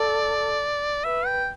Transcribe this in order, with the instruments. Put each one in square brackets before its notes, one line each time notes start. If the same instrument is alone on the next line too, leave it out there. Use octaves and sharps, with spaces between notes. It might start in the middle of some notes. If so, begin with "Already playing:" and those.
Already playing: [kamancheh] A4 [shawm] D5
[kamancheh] B4 [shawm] E5
[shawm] G5